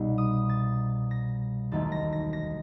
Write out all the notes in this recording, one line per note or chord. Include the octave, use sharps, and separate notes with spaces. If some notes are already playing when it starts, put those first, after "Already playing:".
Already playing: C2 B2 G3 B3 D#4
D#6
A6
A#6
E1 D#2 D#3 F#3 A3 A6
A#6
A#6
A#6